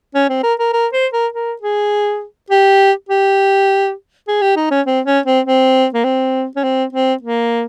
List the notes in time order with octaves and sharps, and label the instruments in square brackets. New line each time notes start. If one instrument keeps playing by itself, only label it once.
[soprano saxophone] C#4
C4
A#4
A#4
A#4
C5
A#4
A#4
G#4
G4
G4
G#4
G4
D#4
C#4
C4
C#4
C4
C4
A#3
C4
C#4
C4
C4
A#3